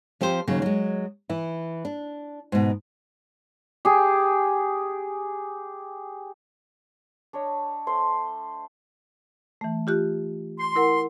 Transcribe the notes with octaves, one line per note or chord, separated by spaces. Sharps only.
F3 C4 G4 C5
D#2 C#3 F#3
F#3 G#3
E3 E4
D4
G#2 B2
G4 G#4
D4 C#5 D#5
A3 C5 C6
E3 A3
F4 G4 F#6
C6
E4 A#4 F#5